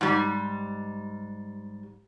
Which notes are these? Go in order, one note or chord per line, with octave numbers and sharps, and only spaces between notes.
G#2 G3